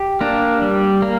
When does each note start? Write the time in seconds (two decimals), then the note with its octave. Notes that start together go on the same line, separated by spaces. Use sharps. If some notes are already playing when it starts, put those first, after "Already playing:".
Already playing: G4
0.21 A#3 D4
0.61 G3
1.02 A#3